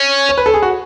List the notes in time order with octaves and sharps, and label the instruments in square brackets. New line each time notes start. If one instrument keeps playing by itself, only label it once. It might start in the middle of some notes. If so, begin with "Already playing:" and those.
Already playing: [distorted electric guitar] C#4
[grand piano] C#5
B4
A4
G#4
F#4